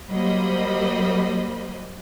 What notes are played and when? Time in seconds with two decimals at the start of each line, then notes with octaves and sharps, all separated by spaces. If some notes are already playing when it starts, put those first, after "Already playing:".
0.12 F#3 G3 A#3 C5 D#5 B5